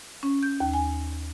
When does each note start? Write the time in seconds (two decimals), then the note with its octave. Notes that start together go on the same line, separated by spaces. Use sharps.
0.23 C#4
0.43 G6
0.60 D#2
0.73 G#5